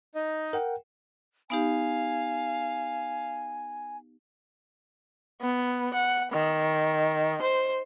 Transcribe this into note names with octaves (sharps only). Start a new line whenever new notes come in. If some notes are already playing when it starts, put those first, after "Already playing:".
D#4 D#5
A#4 F#5 G5
B3 D#4 G4 F5 G#5
B3
F#5
D#3
C5